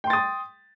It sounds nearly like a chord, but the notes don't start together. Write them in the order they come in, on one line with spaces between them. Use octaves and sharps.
G5 C6 A6 D#6